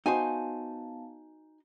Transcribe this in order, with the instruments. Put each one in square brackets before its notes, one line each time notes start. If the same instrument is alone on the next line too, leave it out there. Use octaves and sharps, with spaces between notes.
[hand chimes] B3 F5 A5 [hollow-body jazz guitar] D#4 F#4 C5 [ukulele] G#5